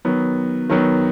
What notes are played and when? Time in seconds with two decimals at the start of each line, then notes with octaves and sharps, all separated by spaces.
0.05 D#3 F#3 B3
0.70 D#3 F#3 B3